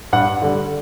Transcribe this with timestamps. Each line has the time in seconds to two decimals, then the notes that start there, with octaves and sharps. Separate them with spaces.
0.13 G2 F#5
0.42 D3 G3